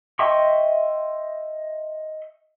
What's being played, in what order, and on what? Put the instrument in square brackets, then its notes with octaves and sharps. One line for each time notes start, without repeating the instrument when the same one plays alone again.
[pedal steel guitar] D#5 E5 G5 C6 C#6